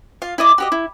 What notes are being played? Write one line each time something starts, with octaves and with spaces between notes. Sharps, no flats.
F4 F5
E4 D5 D#5 D6
F#4 G4 D#5
E4